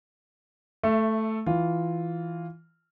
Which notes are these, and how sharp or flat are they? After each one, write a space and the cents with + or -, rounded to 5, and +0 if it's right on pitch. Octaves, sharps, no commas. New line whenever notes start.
A3 +0 E5 +25
E3 +0 F4 +0